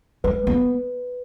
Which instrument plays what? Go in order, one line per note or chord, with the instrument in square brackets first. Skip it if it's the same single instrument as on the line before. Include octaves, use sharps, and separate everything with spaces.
[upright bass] G#3 [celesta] B4
[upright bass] B3